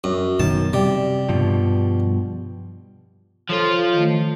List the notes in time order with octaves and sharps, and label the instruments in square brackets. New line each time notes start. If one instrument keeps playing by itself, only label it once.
[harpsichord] F#2
[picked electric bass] F#2 B2 D#3 [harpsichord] A5
[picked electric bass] C3 [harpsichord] G3
[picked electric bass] G2 B2 F3
[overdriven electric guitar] F3 F4 [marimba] A4 C5 C#5
[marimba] D#3 A3